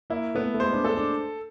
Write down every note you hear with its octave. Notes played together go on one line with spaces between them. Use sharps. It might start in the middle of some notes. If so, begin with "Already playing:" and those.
A#3 E4
A3 B3
A3
G#3 C5
D4
D4 A4
D4